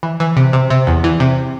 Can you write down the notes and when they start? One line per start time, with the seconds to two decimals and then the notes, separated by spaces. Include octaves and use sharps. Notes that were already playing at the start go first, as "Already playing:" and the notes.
0.03 E3
0.20 E3
0.37 C3
0.53 C3
0.70 C3
0.87 E2
1.04 E3
1.20 C3